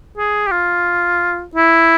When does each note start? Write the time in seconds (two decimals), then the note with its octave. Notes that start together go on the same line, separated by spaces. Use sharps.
0.17 G#4
0.47 G4
0.52 F4
1.55 E4